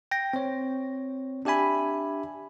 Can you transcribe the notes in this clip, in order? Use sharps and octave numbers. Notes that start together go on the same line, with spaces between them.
G5 A#6
C4 C#5
D4 G4 E5 G#5 B5